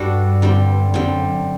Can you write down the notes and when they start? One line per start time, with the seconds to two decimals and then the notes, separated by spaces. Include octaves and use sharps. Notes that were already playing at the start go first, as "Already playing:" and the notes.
Already playing: G2 G3 D4 F#4 A4
0.42 D3 G3 C4
0.94 F#2 D3 G3 C4